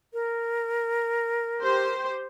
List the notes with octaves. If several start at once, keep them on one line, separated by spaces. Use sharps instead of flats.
A#4
G4 C5